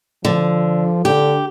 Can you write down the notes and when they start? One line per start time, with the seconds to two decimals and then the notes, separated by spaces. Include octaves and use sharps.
0.25 D3 F3
1.05 D3 G4